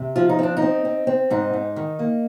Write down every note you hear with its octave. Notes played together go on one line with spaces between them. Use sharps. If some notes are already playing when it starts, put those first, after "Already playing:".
Already playing: C3
F3 F4
D#4
C4 D4
D#4
C4
C4
C4
G#2 D#4
G#2
D#3
A#3